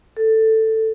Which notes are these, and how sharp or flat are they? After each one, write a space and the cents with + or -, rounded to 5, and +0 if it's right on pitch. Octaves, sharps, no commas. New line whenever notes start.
A4 +10